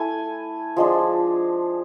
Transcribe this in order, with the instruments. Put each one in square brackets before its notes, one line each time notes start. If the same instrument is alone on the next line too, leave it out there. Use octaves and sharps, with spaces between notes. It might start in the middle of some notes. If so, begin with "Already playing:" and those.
Already playing: [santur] A3 E4 G#5
F3 G#3 D4